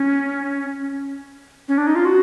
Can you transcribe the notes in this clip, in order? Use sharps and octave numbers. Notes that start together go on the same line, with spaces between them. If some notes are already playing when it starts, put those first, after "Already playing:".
Already playing: C#4
C#4
D4
D#4
F4
F#4